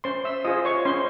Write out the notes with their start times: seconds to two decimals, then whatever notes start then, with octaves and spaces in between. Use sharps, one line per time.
0.04 C#4 C5 C6
0.25 E5 E6
0.44 F4 G#4 C5 D#5 D#6
0.65 C#5 C#6
0.85 C#4 C5 C6